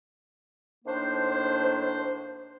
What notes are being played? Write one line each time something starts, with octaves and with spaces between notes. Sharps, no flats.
A2 D#3 A#3 D4 C5